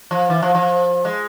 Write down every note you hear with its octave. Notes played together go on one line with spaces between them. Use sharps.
F3
E3
F3
F3
G#3